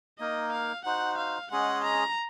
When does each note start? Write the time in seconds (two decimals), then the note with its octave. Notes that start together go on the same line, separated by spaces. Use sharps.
0.20 A#3 D#4 A#4 D#5
0.52 F5
0.85 D#4 F#4 C5 F#5
1.18 F5
1.51 G#3 C#4 G#4 D#5 F#5
1.84 A#5